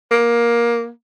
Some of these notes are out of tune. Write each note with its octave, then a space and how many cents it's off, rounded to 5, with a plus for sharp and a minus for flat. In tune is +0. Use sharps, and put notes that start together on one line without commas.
A#3 +15